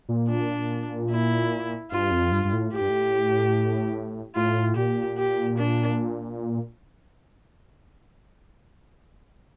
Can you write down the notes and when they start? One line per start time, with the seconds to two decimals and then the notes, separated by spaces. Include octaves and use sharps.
0.09 A#2
0.29 D4
1.10 E4
1.91 G2 F4
2.11 F2
2.32 G2
2.45 G2
2.53 A2
2.73 A2 G4
2.81 G2
2.89 A2
4.36 A2 F4
4.76 A#2 G4
5.17 G4
5.58 D4